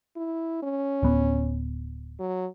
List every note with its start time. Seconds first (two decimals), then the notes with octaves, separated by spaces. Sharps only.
0.16 E4
0.63 C#4
1.03 D1 B3
2.19 F#3